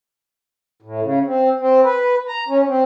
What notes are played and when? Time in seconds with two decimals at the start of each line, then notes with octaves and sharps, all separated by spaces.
0.82 A2
1.03 C#3
1.26 C4
1.60 C4
1.84 B4
2.28 A#5
2.48 C#4
2.68 C4